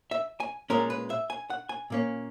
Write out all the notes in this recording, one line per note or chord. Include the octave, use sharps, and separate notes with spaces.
E5
G#5
A#2 G#3 C#4 A#4
B4
E5
G#5
F#5
G#5
A#2 A#3 C#4